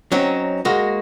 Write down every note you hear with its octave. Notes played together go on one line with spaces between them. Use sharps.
F#3 C4 C#4 D#4
G#3 A#3 F#4